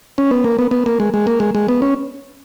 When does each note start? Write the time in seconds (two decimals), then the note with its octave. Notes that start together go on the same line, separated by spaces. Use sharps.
0.18 C#4
0.31 B3
0.44 A#3
0.59 B3
0.71 B3
0.86 A#3
1.00 G#3
1.14 G#3
1.27 A#3
1.40 G#3
1.55 G#3
1.68 B3
1.82 C#4